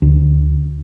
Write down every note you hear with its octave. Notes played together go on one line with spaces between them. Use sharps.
D2